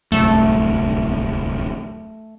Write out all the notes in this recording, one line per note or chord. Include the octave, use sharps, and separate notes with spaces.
D1 C2 F#2 A3